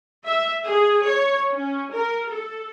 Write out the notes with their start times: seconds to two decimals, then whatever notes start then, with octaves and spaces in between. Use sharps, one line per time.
0.25 E5
0.63 G#4
1.05 C#5
1.51 C#4
1.92 A#4
2.29 A4